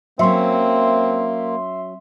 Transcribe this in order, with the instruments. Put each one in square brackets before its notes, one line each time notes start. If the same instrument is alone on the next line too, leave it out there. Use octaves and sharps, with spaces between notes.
[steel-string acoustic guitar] F#3 C#4 [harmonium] A#3 [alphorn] C4 [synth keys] E5 C6